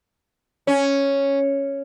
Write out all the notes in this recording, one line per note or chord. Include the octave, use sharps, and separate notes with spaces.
C#4